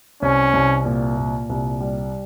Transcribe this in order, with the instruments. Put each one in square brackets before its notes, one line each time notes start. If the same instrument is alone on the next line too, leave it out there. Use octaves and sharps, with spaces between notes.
[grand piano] C2 [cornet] C#4
[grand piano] C2
A#2
A#2
C2
G3